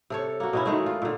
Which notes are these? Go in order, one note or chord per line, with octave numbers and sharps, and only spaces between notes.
C3 A4 C#5
A#3 F#4
B2 C#4 E4
D#3 G#3 A3
F4
A#2 D3